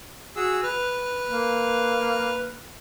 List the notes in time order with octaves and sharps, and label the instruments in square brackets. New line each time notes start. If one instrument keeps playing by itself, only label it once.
[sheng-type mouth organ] F#4 G#4 E6
B4 F6
[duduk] A#3